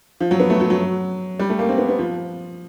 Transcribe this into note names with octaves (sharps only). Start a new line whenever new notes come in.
F3
F#3
B3
A3
F#3
F#3
G3
A3
A#3
C4
B3
B3
F3